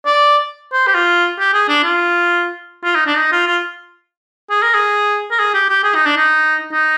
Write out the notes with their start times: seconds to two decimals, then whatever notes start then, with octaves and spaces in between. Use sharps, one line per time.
0.06 D5
0.73 C5
0.87 G4
0.95 F4
1.39 G4
1.54 G#4
1.69 D4
1.84 F4
2.84 F4
2.95 D#4
3.06 D4
3.17 D#4
3.32 F4
3.47 F4
4.50 G#4
4.62 A#4
4.74 G#4
5.31 A#4
5.39 G#4
5.54 G4
5.69 G4
5.84 G#4
5.95 D#4
6.06 D4
6.17 D#4
6.72 D#4